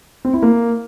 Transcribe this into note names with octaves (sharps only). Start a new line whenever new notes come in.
C4
E4
A#3